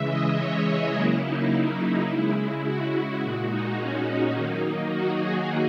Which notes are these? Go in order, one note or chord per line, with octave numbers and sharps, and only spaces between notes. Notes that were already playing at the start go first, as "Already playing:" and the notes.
Already playing: C#3 E3 G#3 E5
D#5
C#5
G#4
C#3 F#3 A#3 E4
D#4
E4
C#3 G#3
E4
F#4
F#4
A#2 G#3 F#4
D#4
C#4
D#4
D#3 F#3 A#3
F#4
G#4